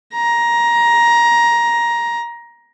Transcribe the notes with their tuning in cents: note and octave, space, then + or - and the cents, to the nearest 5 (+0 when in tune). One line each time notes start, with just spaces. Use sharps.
A#5 +15